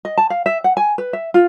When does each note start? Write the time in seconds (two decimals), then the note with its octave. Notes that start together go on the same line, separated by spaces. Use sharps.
0.05 D#5
0.18 A5
0.30 F5
0.46 E5
0.64 F#5
0.77 G#5
0.98 B4
1.13 E5
1.34 F4